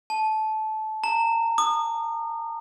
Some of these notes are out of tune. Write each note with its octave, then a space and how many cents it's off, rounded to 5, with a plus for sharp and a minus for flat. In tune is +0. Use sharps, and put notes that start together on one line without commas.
A5 -20
A#5 -25
D#6 -30